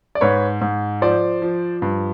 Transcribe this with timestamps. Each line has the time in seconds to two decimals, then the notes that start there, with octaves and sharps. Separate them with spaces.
0.15 D5
0.21 G#2 B4 C#5
0.61 G#2
1.02 F3 C5 D5
1.42 F3
1.82 G2